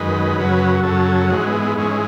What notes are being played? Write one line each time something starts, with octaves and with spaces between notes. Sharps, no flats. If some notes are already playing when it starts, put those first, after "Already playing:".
Already playing: F#2 D#3 G#3 B4
F#2 C#3 F#3
F#2 C#3 F#3 A4
G#2 E3 G#3 F#4
C#4
B3
B3
G#2 E3 G#3 C#4